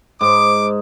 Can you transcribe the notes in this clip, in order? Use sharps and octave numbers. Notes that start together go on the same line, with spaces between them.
G#2 D6